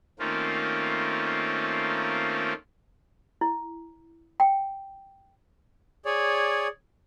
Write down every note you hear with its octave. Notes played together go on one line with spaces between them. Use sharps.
D#3 A3 A#3 C4 C#4 F4
E4
G5
G#4 C#5 D5